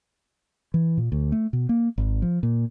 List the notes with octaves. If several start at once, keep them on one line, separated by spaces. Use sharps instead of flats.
E3
A#2
D2
A3
B2
A#3
G#1
F3
A#2